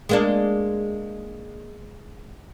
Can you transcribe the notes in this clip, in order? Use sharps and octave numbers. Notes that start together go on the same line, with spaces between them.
G#3 A#3 D4